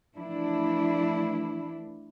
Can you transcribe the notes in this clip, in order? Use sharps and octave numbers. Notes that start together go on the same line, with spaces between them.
E3 F3 A3 D4 E4